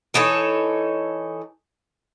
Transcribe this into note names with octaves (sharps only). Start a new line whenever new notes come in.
E3 D#4 A4 C#5